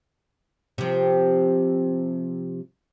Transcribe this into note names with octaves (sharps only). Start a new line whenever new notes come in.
C3 F3